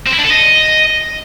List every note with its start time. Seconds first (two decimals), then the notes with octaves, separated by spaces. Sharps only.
0.07 C4
0.13 E4
0.19 D4
0.25 A4
0.30 D#5